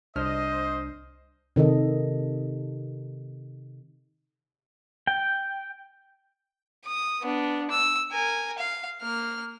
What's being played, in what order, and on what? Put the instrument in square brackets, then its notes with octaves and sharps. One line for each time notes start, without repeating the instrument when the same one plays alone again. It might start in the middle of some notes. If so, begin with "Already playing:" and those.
[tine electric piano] C2 D4 F6 [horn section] C5 D#5
[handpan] C3 D#3 A4 D#5
[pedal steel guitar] G5
[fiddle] D#6
B3 D4
E6
A#4 G#5
F5
A#3 F6